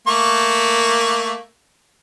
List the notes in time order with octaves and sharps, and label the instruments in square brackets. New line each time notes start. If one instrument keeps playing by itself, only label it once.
[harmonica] A3 A#3 C#6